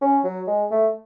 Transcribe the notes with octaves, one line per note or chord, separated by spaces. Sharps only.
C#4
F#3
G#3
A3